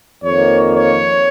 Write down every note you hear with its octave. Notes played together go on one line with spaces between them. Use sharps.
F2 D#3 A#3 C#5
C#5